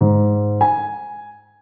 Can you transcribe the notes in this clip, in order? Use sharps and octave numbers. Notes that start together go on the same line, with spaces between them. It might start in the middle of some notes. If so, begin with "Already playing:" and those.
G#2
G#5